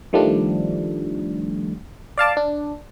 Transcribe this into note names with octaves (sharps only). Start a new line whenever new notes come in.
D#3 F3 G3 A3 D4
D5 F5 A5 D6
D4